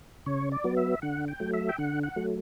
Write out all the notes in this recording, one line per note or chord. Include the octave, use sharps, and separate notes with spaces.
C#3 C#5
D5
F#3 B3
E5
D3 F#5
G5
F#3 A3
E5
G5
D3 F#5
F#5
F#3 A3